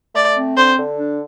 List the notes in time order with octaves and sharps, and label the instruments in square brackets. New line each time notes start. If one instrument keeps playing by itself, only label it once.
[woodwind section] A3 [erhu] D5
[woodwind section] C4
[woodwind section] D3 [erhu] C5
[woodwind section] D3
D4